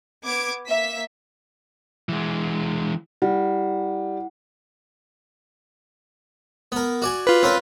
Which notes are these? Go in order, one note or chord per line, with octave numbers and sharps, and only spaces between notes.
B3 D6 G#6 D7
A#3 E5 B6
E3 G#3
G3 E4 F#5
B3 A#4
F#4 D5 G#5
F4 B4
C4 C#4 A#4